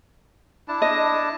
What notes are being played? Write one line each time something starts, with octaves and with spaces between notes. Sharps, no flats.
D4 E4 A5
D#5